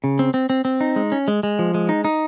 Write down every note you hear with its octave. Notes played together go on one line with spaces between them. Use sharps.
C#3
C4
C4
C4
C4
D#4
G#3
C#4
G#3
G#3
F3
G#3
D#4
D#4